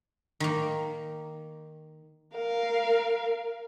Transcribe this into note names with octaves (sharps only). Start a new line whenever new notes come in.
D#3 A#3
A#4 F5